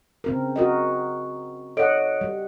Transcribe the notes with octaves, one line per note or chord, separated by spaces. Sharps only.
C#3 C4 A#4
F#4 A#4 D#5
A4 C#5 D#5 F#5 D7
G3